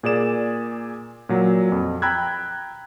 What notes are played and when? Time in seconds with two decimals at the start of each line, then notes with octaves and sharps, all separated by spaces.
0.03 A#2 G#4 D5 E7
1.29 A#2 F#3
1.72 F2
2.02 G5 A#5 B5 E6 F#6 G#6